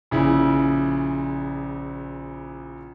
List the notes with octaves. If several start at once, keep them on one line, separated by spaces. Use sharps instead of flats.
A#1 C#3 E4